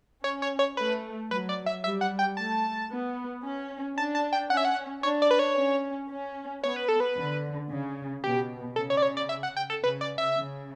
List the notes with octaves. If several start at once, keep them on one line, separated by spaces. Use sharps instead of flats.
C#4 C#5
C#5
C#5
A3 B4
F#3 B4
D5
E5
G3 E5
F#5
G5
A3 A5
B3
C#4
D4 A5
A5
G5
C#4 F#5
E5
F#5
D4 C#5
D5
B4
C#5
C#4
C#4
B3 C#5
B4
A4
B4
D3
C#3
B2 G4
C#3 A4
C#5
D5
C#5
D5
E5
F#5
G5
A4
C#3 B4
D5
E5
C#3